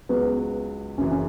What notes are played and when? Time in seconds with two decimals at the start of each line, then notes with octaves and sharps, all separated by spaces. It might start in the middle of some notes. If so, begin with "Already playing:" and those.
0.09 C#2 C#3 F#3 B3
0.98 F#1 F#2 C#3 E3 C#4
1.11 C#4